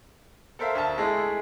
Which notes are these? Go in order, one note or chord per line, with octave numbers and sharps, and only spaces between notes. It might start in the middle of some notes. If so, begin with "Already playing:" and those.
A4 A#4 C5 E5 F5
D2 A5
G#3 A3 E4 G#4